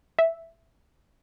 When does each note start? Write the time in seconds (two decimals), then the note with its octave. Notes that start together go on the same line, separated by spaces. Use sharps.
0.19 E5